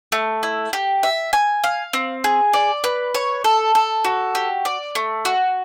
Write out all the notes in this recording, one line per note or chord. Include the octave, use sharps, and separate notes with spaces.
A3
E4
G4
E5
G#5
F5
C4
G#4
D5
B4
C#5
A4
A4
F#4
G4
D5
A3
F#4